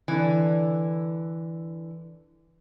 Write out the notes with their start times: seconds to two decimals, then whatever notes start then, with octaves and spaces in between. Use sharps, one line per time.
0.08 D3 E3